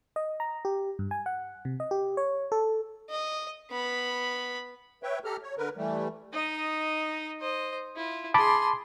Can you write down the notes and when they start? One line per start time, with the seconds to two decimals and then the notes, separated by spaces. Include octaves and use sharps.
0.16 D#5
0.40 A#5
0.65 G4
0.99 G2
1.11 G#5
1.26 F#5
1.65 C3
1.80 D#5
1.91 G4
2.17 C#5
2.52 A4
3.09 D#5
3.71 B3 B5
5.03 B4 C#5 E5 G5
5.25 G4 A4 A#5 F6
5.43 C#5
5.58 D3 A#4 B4
5.77 E3 G3 A3
6.33 D#4 D#5
7.40 C5 D#5
7.96 E4 F4
8.34 G#4 A5 B5 C6 D6